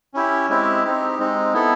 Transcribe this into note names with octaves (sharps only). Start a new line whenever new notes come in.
C#4 E4 G4
G#3 C4 E4 G4
C4 D#4 G4
G#3 C4 D#4
B3 E4 A4